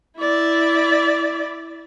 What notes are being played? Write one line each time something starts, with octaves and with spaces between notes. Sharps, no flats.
E4 D5